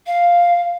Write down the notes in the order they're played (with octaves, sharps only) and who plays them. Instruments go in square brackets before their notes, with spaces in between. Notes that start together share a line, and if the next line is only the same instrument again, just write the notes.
[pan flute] F5